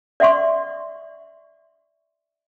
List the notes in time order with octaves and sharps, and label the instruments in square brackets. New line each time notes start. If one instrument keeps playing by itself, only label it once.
[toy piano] D5 E5 F#5 C6 C#6